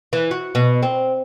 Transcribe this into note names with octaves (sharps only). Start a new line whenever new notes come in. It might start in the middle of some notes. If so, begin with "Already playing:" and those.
E3
F#4
B2
C4